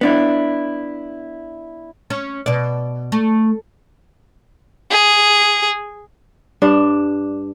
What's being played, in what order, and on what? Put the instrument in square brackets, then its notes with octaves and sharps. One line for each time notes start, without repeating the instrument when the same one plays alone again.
[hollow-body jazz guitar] B3 D4 E4
[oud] C#4
B2 D5
A3
[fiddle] G#4
[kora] G2 D4